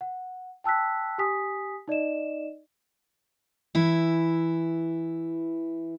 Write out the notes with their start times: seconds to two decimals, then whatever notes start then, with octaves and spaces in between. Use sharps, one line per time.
0.01 F#5
0.64 G5 A5 E6 F#6 B6
1.18 G4 G#5 D#6 B6
1.88 D#4 D5 D#5 E7
3.75 E3 E4